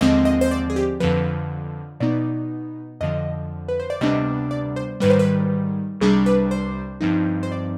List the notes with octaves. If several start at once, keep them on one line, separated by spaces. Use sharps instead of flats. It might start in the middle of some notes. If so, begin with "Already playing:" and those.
D#2 D3 F3 G#3 C4 D#5
D#5
C5
D5
G#4
G4
F2 D3 F3 B4
B2 B3 D#4 D5
F2 D3 F3 D#5
B4
C5
D5
D2 C3 G3 B3 D4 D#5
D5
C5
G#2 D#3 G3 B4
C5
B4
C2 C3 G3 D4 G#4
B4
C5
G2 F3 C4 D#4
C5
D5